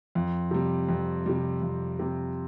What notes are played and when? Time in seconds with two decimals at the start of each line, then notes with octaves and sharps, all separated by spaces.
0.15 F2
0.51 C3 G3
0.89 F2
1.26 C3 G3
1.62 F2
1.99 C3 G3